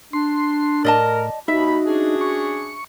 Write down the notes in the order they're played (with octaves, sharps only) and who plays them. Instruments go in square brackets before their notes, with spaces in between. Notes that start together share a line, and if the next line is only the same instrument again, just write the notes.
[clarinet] D4 [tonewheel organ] C6
[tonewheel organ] A2 [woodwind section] A#4 [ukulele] D5 D#5 A5
[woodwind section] D#2 B5 [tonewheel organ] D#4 [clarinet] F#4 [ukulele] E5
[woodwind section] C#4 D4 G#4
[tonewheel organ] C#6